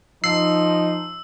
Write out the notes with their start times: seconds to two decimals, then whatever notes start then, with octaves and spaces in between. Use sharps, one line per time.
0.24 F3 D#4 E6 C7